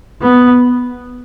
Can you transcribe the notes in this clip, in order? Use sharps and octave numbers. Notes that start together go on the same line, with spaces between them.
B3